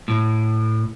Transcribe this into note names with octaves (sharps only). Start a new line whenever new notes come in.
A2